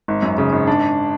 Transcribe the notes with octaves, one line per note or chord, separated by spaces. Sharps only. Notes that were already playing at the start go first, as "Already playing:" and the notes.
G#1
F#2
C#3
G#1
D4